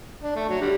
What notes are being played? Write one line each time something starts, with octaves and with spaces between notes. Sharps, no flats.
D4
A3
F#3
D3 G3